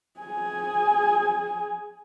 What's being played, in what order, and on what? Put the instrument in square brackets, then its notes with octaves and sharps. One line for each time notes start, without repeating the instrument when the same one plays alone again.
[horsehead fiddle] G#4 G#5